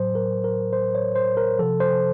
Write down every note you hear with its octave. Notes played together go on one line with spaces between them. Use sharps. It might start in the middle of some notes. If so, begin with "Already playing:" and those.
Already playing: A2 F#3 C5
A#4
A#4
C5
C#5
C5
A#4
C3 F3 A4
C5